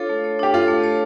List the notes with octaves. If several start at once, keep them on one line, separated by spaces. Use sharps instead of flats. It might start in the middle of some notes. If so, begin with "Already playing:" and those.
Already playing: D4 F4 A4 C#5
A3
C#5
D4 G4
F4 A4
A3
C#5